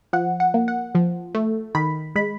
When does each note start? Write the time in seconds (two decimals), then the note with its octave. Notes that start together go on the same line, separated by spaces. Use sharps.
0.13 F3 F#5
0.40 F#5
0.54 A#3
0.68 F#5
0.95 F3
1.35 A3
1.75 D#3 B5
2.15 G#3 B5